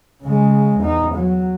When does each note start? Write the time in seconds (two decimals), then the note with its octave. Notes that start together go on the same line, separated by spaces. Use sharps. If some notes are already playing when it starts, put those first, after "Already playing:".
0.22 C#3 G#3
0.79 E2 D#4
1.14 F#3